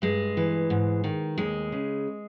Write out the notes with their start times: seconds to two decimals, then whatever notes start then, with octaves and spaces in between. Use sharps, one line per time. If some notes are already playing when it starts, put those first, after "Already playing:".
0.02 G2 G#3
0.37 E3
0.70 G#2
1.04 D#3
1.38 D#2 G#3
1.72 C#3